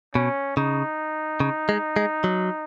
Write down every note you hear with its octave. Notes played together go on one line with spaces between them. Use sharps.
B2 C#4
C#3 D#4
C#3
G#3
G#3
F#3